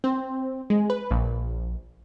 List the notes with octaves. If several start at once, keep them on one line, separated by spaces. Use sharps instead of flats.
C4
G#3
B4
A#1